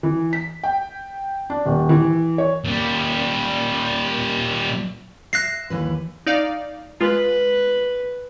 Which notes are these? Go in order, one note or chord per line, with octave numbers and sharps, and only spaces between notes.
E3
B6
G5
D4
D#1
E3
C#5
A#2 G3
E5 F#6 A#6 C7
D#2 E3 B4
D#4 D5 F5
G#3 F4 B4